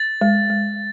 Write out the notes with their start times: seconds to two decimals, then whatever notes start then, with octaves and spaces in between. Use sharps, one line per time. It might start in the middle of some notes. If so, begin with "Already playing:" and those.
Already playing: A6
0.21 G#3
0.50 G#3